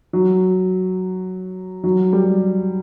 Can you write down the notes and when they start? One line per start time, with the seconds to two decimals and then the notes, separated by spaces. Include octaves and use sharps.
0.13 F#3
1.84 F#3
2.13 G3